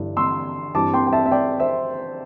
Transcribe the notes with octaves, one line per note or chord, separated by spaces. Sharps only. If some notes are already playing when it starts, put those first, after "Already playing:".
Already playing: G1 G2 E3
C6 E6
G2 E3 G3 C4 A5 D6
G5 C6
G5
E5 A5
E5
D5 G5
C5 E5